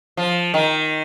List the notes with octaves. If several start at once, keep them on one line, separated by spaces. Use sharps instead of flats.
F3
D#3